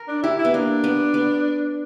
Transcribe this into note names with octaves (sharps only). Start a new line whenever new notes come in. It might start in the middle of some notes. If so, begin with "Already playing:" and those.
Already playing: A#4
D4
E4 G4
E4
B3
A#3 D4
B3
B3